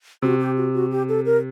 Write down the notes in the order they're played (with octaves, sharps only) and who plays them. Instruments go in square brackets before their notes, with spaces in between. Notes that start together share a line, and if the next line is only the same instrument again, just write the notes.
[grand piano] C3 [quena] F#4
[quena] G4
F#4
F#4
G4
A4
A#4